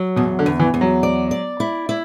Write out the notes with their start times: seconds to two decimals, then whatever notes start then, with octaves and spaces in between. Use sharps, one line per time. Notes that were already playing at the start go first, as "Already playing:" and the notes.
Already playing: F#3
0.16 E2 B2
0.39 D3
0.46 E2
0.60 E3
0.74 E2
0.81 F#3
1.03 D5
1.31 D5
1.60 E4
1.89 E4